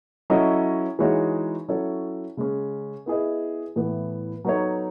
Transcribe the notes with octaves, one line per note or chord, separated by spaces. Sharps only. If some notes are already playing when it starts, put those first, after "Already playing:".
F#3 C#4 E4 A4 D#5
E3 G#3 D#4 F#4 C#5
F#3 C#4 E4 A4 C#5
C#3 G#3 C#4
B3 E4 G#4 B4 D#5
A2 E3 B3
F#3 B3 D#4 A4 C#5